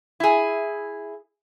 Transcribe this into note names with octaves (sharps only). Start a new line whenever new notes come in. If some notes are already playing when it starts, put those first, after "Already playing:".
E4 G#4